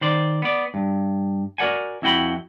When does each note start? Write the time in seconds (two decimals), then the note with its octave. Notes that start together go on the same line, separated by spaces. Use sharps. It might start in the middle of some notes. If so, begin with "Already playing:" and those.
0.01 D#3 C5 D5
0.42 B3 D5
0.74 G2
1.58 F#4 A#4 D5 F#5 G#5
2.02 F2 E4 F#4 G5 B5